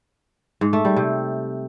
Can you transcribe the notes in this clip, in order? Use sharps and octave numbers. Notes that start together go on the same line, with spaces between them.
G#2
A3
G3
C3